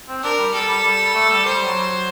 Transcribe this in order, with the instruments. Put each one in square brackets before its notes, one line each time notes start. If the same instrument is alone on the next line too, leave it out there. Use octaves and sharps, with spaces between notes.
[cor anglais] C4
[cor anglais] D4 [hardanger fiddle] A#4
[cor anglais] G3
[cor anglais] G3 [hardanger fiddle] A4
[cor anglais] G3
G3
A3
G3
[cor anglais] G3 [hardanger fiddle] C5
[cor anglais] G3
F#3